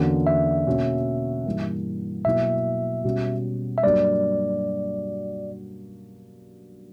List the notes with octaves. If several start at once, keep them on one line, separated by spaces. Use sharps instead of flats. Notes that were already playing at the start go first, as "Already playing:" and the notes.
Already playing: E2 D3 A#3 C#4 F#4
E5
B2 A#3 C#4 F#4
G2 E3 A#3
B2 F#3 A#3 E4 E5
B2 G3 C#4 F#4
E5
G2 F#3 A#3 D4 F#4 D5